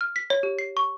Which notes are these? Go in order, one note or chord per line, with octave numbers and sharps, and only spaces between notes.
F6
B6
C#5
G4
C7
C#6